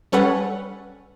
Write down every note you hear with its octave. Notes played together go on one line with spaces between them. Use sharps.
G3 C#4 A4 B4 F#5